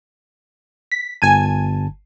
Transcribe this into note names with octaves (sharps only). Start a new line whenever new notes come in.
B6
G1 G#5 A5 G#6 D#7